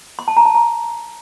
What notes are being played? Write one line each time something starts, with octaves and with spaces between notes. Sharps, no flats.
C6
A5
A#5
A5
A#5